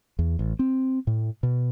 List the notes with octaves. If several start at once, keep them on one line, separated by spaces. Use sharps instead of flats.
E2
A1
C4
A2
B2